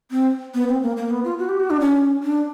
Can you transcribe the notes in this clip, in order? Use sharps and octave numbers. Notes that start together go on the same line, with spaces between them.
C4
B3
C4
A#3
A#3
B3
F4
F#4
G4
F#4
D4
C#4
D4